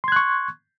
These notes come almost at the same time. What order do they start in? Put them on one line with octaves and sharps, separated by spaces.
C6 G#6 F#6 C#6